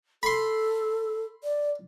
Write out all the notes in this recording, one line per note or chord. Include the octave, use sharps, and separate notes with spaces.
A4 B5 C6
D5